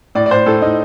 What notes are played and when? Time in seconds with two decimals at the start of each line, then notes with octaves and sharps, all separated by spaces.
0.15 A2 D5
0.26 D5
0.31 A2 C5
0.46 A2 A4
0.62 A2 D#4